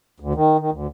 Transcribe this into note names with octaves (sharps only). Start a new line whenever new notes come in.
D2
D#3
D#3
D2